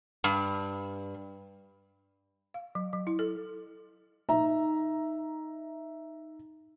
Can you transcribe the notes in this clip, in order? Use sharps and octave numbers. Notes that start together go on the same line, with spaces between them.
G2
F5
F#3
F#3
E4
A4
D#4 E5 A#5